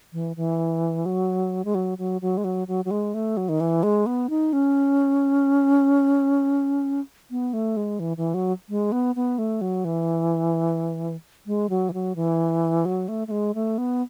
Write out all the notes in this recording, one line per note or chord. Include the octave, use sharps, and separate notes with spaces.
E3
E3
F#3
G#3
F#3
F#3
F#3
G#3
F#3
F#3
F#3
G#3
A3
F#3
D#3
E3
G#3
B3
D#4
C#4
B3
A3
G#3
E3
E3
F#3
G#3
B3
B3
A3
F#3
E3
G#3
F#3
E3
F#3
E3
F#3
A3
A3
G#3
A3
B3